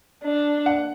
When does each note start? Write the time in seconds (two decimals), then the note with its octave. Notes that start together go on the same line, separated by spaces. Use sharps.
0.23 D4
0.66 F#5